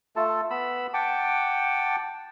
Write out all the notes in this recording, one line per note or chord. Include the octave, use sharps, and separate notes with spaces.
A3 F4 A4 A5
B3 B5 E6
F#5 G5 A5 D6